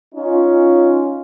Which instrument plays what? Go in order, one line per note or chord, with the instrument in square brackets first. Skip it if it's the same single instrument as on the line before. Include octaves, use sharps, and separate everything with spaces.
[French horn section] C#4 D#4 F4